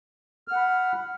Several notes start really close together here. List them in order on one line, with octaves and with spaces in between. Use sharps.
F6 F#5 B5